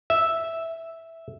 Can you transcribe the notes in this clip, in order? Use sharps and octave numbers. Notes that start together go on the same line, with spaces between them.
E5